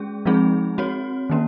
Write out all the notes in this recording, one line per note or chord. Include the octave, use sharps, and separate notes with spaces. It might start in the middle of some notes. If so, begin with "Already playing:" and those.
Already playing: G#3 C#4 G#4
F3 G#3 C4 D#4 G#4
C4 F#4 C#5
D#3 A#3 C#4